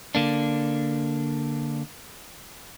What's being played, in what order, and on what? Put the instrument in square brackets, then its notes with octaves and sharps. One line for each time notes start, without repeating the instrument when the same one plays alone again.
[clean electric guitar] D3 A#3 D4